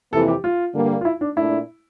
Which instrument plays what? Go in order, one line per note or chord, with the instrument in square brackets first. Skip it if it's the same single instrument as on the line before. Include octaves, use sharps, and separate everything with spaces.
[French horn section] F2 C3 E3 A#3 E4 [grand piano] A4
[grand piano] G4
F4
[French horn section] G2 D3 G3 A#3
[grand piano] F4
E4
D4
[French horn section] A#2 A3 D4 [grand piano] E4